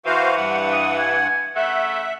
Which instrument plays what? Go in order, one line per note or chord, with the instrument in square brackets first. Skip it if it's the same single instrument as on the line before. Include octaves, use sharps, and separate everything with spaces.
[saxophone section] E3 [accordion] F#4 C5 F5
[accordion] G2 F#5
[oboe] D#6
G#5
[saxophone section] C#3 A3 [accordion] E5 [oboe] F#5